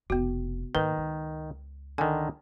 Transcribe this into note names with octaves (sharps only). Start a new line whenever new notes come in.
F1 B2 B3 F#4
G#2 D#3 A#3 B4
C#2
D3 D#3 G#5